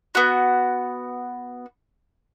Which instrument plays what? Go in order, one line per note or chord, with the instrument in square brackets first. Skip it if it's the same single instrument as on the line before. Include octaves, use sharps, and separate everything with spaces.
[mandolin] B3 F#4